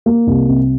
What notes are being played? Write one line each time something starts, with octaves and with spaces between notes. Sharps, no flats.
A#3
C2
C3